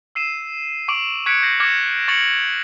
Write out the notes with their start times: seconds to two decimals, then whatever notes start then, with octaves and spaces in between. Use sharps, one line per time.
0.15 E6 C7 D#7 E7
0.88 C#6 D6 C7 D7 F7 F#7
1.26 C#6 F#6 G#6 B6 C#7 D7
1.43 G6 A#6 C7 F#7
1.60 D6 F6 G#6 A#6 C#7 E7
2.08 C#6 A6 C#7 F7 F#7